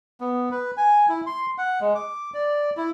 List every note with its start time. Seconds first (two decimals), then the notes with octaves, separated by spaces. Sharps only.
0.21 B3
0.52 B4
0.77 G#5
1.09 E4
1.27 C6
1.58 F#5
1.81 G#3
1.95 D6
2.34 D5
2.77 E4